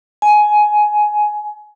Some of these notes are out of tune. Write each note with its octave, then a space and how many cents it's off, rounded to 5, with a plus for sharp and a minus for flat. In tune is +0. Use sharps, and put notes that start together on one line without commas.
G#5 +15